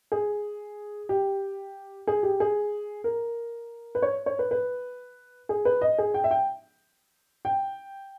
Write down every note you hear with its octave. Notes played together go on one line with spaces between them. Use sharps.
G#4
G4
G#4
G4
G#4
A#4
B4
C#5
C#5
B4
B4
G#4
B4
D#5
G#4
G5
E5
G5
G5